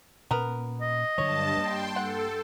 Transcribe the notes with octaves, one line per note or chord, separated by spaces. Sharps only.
A#2 B3 C#4 A#4
D#5
G2 D3 F#3 C#5 A5
G3 A#3 G5 C6
A4 F#5